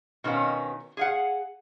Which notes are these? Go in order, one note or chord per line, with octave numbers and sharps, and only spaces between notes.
B2 D#3 C4 C#4 F5
G#4 F5 F#5